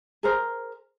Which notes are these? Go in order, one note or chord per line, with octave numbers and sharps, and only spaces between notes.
G#4 A#4 C5